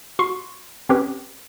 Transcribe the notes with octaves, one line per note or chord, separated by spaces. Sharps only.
F#4 C6 C#6 C7
C4 C#4 G4 B4